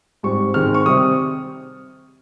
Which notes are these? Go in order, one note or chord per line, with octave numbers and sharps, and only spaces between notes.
G#2 G3 C4 C#6
G#2 D#3 G#3 C4 F6
C#6
C3 G3 C4 D#6